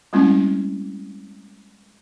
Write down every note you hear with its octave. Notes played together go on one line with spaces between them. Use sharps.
G3 G#3 A#3 C4 C#4 E4